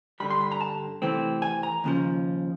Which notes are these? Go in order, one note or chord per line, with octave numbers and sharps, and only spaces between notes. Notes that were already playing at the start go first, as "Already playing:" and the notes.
G2 D3 G3 B5
C6
B5
A#5
A5
C3 E3 A3 C4
G#5
A#5
D#2 C#3 F3